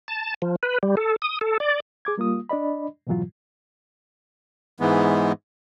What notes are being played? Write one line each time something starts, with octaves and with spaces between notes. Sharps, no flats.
A5
F3
B4
G3
A4
D#6
A4
D5
G#4 D6 G#6
G3 A#3 F4 D#6
D4 D5 D#5 B5
F2 G#2 B2 E3 F#3 F4
G#2 E3 G#3 B3